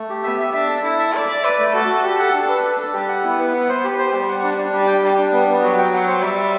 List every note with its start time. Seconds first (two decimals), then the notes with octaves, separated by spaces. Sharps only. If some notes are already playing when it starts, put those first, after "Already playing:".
Already playing: A3
0.10 G4
0.23 B3 E5
0.40 E5
0.54 D4 E5
0.69 A4
0.84 E4 A4
0.99 E5
1.14 D5 E5
1.29 E5
1.44 B4 D5
1.59 A3
1.74 F#4 A4
1.88 F#4
2.03 G4
2.19 F#5
2.34 D4
2.48 B4
2.64 D4
2.79 A4
2.93 G3 G4
3.08 F#5
3.23 B3 E4
3.38 B4
3.53 F#5
3.69 C5
3.84 B3 G4
3.98 C5
4.13 G3 G4
4.28 F#5
4.43 D4
4.58 D4
4.73 G3 G4
4.87 G5
5.03 G3 D4
5.18 D4
5.32 G3 B3
5.48 B3
5.62 F#3 F#4
5.78 G5
5.93 F#3 F#5
6.07 C5
6.22 G3 E5
6.37 E5